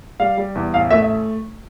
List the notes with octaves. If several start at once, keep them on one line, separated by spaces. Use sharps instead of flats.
G3 F5
G3
E2
A1 F5
A3 E5
E5